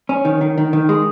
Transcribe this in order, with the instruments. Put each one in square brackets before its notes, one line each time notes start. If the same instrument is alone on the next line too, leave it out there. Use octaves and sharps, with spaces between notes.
[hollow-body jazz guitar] C#4
D#3
D#3
D#3
D#3
G#3